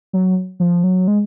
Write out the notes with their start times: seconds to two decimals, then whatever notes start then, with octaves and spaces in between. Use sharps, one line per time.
0.13 F#3
0.60 F3
0.84 F#3
1.08 G#3